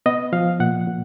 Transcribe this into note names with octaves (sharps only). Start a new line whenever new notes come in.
B3 D#5
F3 F5
A#2 F#5
A#2